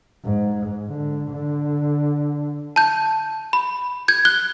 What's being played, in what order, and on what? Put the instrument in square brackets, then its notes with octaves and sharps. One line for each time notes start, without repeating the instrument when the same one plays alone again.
[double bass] G#2
D3
D3
[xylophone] A5 G6
B5
G6 G#6
F#6 G7